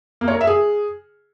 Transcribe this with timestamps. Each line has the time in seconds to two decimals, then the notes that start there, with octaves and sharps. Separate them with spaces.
0.21 A#3
0.28 C#5
0.34 A#4
0.41 E5
0.47 G#4